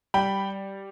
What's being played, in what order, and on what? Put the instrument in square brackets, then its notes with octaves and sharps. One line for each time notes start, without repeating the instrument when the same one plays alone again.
[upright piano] G3 G5 B5